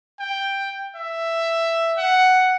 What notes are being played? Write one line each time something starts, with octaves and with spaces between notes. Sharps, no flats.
G5
E5
F#5